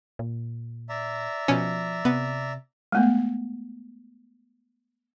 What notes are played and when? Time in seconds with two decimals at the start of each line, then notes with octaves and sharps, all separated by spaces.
0.19 A#2
0.89 D5 E5 A#5
1.48 B2 F3 C#4
2.05 C3 B3
2.92 G#3 A3 B3